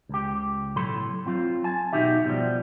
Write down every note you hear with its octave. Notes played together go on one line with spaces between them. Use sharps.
C#2 G4
B1 A2 F#3 A4 B5 C6
F#3 C4 F4
G#5 A5
B1 E2 D#4 F#4 G4 E5
B2 F3 G3